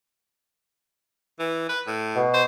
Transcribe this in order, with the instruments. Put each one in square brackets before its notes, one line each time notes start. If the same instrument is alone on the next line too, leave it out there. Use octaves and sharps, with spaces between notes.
[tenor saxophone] E3
B4
A2
[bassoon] B2
[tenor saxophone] C5